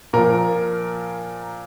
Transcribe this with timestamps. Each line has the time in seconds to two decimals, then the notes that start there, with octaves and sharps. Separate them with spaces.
0.13 A#2 F3 A#4